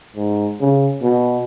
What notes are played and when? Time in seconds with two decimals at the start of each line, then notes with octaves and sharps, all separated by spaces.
0.17 G#2
0.61 C#3
1.03 B2